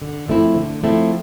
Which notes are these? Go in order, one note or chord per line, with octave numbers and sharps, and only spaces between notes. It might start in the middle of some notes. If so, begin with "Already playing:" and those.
D3
F3 A3 C4 E4
D3
F3 A3 C4 E4